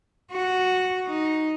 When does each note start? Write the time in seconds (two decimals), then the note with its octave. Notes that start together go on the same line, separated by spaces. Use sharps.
0.32 F#4
1.07 D#4